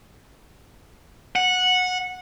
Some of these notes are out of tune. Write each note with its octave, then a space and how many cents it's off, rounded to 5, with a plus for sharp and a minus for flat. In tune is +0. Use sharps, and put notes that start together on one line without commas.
F#5 -15